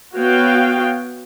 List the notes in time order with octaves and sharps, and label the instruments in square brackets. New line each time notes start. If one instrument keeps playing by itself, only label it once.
[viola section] B3 F#4 C#5 F5 G5